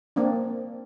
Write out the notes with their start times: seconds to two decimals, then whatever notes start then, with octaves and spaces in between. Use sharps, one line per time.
0.16 A#3 C4 D4